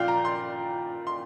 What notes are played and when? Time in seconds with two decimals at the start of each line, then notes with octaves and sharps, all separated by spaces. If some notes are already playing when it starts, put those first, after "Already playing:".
Already playing: A#2 F3 D5 F5 G5
0.08 A#5
0.25 C6
1.07 C6